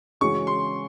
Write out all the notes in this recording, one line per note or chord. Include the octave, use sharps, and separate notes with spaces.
C#3 E3 G#3 C#4 F#4 C#6
C6